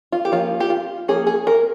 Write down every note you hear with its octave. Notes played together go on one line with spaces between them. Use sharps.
F4
G4
F3 A#3 C#4 F4
G4
F4
F3 A#3 C#4 G#4
G#4
A#4